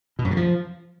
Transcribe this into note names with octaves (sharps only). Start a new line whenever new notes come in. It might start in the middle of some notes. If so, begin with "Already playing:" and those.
B2
F#2
C#3
F3